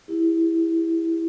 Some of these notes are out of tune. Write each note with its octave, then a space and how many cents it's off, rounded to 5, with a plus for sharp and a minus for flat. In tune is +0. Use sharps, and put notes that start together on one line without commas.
E4 +0 G4 +40